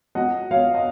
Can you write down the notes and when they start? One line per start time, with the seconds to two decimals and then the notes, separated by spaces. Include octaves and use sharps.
0.15 F#3 D#5 F#5
0.51 F#3 C#5 F5
0.75 D#5